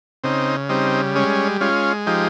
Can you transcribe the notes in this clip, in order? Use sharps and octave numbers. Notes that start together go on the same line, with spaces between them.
C#3 C4 D#4
G3 C4 D#4
G#3 C#4
G#3 C#4 F4
F3 D#4 G4